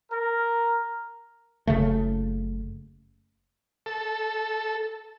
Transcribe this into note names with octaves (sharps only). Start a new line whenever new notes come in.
A#4
F#1 C#2 C#3 A3
A4